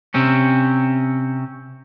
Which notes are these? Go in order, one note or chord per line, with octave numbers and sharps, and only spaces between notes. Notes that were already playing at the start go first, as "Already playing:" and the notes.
C3 C4 C#4